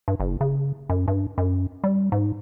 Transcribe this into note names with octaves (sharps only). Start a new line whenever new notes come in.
G2
F#1
C#3
F#2
G2
F#2
G3
G#2